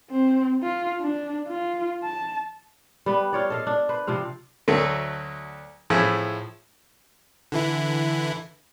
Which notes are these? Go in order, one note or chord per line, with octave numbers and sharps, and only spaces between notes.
C4
F4
D4
F4
A5
G3 B3 B4
F4 C#5 D5
A4 D#5 F5
D4
B4 C5
C3 F3 C4 F5
D2 F#3 A3
A2 F3 E4 G#4
D3 E3 E4